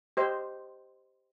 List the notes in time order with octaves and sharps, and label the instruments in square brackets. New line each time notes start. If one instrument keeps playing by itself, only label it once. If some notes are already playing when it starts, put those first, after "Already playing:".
[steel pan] G4 C5 D#5